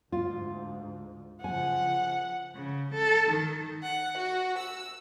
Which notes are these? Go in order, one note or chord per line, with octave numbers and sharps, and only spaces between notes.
D2 G#2 F4
C#3 F3 F#5 G#5
C#3
A4
D#3
F#5
F#4
E6